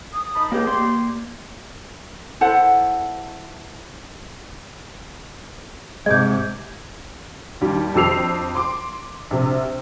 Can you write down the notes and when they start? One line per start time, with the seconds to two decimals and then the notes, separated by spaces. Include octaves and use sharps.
0.13 D#6
0.35 D#4 A5 B5
0.52 C#2 A#3 G4 G#4
0.67 A#3 D5 C6
2.41 E4 A4 C5 F#5
6.06 G#2 C3 G#3 D6 G6 G#6
7.61 D#2 G3
7.94 F2 D4 G4 E6 C7 F7
8.55 C6 D6
9.31 A#1 C3